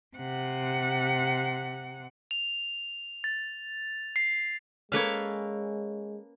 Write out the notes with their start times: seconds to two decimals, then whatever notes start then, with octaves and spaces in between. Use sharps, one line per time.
0.17 C3 F#5
2.31 F7
3.24 A6
4.16 C7
4.92 G#3 A#3 C#4 A4 B4 C#5 F5